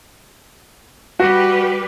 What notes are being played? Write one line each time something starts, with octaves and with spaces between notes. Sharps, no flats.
G3 F#4 G4 B4